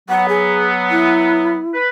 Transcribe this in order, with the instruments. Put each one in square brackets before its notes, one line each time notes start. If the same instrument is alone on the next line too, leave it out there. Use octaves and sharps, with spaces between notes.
[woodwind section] F#3 B3 [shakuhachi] F#5
[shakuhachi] G#4
E4
[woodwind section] B4